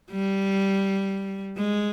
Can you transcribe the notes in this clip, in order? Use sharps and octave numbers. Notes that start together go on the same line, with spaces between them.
G3
G#3